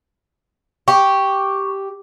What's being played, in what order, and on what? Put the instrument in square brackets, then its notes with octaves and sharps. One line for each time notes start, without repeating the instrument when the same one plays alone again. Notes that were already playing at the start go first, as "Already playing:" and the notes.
[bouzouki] G4 [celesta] C#6